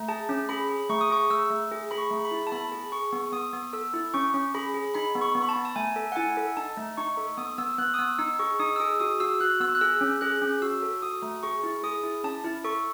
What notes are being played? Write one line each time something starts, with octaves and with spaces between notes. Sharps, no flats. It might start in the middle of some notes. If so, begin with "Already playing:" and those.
Already playing: A3
G#4 A5
C#4
G#4 B5
G#4
A3 C#6
D#6
G#4 C#6
A3 E6
A3
G#4
G#4 B5
C#6
A3
B5
E4
A5
B3 B5
G#4
G#4 C#6
B3
B3 D#6
B3
A4 E6
E4
C#4 C#6
C#4
G#4 B5
G#4
D#4 B5
B3
C#6
B3
B5
A5
B3
A5
A3 G#5
A4
F#5
E4 G#5
A4
D#4 A5
A3
D#4 C#6
A4
B3 D#6
B3 E6
B3 F#6
D#6
B3 E6
D#4 E6
G#4 C#6
D#4 D#6
E6
G#4 D#6
F#4 D#6
F#4 E6
F#4 F#6
B3 E6
F#6
G#4 E6
C#4
G#4 F#6
C#4
F#4 E6
A4
F#4 D#6
A3
G#4 C#6
E4
G#4 D#6
E4
C#4 A5
E4
A4 C#6